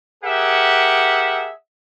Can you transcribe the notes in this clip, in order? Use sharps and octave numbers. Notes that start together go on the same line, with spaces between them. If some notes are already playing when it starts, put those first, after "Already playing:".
G4 G#4 A#4 E5 F#5